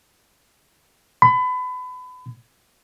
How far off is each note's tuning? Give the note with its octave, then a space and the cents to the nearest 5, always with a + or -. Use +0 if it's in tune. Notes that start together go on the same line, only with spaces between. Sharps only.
B5 +30